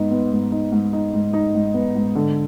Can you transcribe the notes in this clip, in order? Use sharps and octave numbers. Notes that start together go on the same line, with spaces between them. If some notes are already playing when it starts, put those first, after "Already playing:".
Already playing: G#2 B3 D#4
B3
G#2
D#4
G#2
D#4
G#2
D#4
G#2
B3
G#2
D3